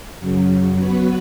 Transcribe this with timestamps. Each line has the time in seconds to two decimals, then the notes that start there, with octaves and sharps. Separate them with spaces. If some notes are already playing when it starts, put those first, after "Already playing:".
0.20 F#2 C#3 F#3
0.77 F#3 B3 F#4 B4